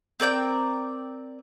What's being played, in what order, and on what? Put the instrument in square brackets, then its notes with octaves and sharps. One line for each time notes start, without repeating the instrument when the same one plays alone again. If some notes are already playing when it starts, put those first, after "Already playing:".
[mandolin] C4 A#4 D5 G5